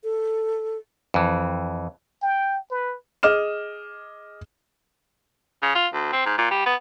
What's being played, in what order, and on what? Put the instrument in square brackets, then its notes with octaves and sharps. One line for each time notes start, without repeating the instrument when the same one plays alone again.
[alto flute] A4
[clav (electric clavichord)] F2 E3
[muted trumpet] G5
B4
[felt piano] G#4 D#5 D6 F6 E7
[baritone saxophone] C#3
F4
D2
C4
G#2
A#2
G3
B3